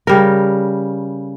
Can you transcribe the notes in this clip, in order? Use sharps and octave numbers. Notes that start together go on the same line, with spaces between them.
C#3 G3 A#4